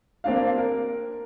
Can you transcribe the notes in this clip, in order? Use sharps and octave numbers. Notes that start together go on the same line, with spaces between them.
A#3 C4 D4 F5
A#4